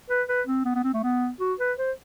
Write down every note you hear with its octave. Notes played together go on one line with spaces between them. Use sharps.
B4
B4
C4
B3
B3
C4
A3
B3
F#4
B4
C5